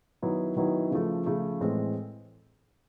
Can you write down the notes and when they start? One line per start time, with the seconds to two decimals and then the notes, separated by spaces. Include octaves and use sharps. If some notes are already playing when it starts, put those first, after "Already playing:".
0.22 D#3 F#3 B3 E4
0.57 D#3 F#3 B3 E4
0.91 C#3 F3 A3
1.26 C#3 F3 A3
1.61 A2 E3 G#3 C4